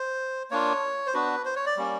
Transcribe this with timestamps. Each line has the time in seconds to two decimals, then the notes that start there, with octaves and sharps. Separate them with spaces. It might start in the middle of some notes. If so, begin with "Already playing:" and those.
Already playing: C5
0.51 A#3 D4 F4 C#5
1.07 C5
1.14 B3 D4 F#4 B4
1.45 C5
1.56 C#5
1.66 D5
1.77 G3 A#3 C#4